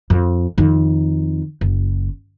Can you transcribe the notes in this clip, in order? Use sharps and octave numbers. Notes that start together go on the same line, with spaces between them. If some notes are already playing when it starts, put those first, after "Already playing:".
F2
F2 D#3
F#1